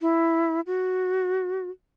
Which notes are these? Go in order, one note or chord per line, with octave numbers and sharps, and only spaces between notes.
E4
F#4